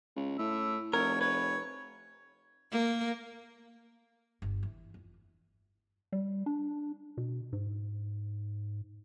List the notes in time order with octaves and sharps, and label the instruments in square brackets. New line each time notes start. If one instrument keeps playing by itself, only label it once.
[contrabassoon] C#2
[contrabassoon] A2 [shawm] E5
[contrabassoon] F1 [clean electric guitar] A#4 [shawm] C#5
[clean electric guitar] B4 [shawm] C#5
[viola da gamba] A#3
[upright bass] G1
E3
F2
[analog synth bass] G3
D4
B2
G#2